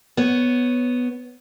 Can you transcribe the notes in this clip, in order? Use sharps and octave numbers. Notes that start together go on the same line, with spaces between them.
B3 C#5